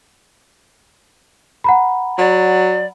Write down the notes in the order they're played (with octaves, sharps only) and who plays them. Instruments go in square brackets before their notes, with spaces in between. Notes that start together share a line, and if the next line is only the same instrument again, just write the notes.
[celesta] F#5 A#5 B5
[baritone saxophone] F#3 [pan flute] D5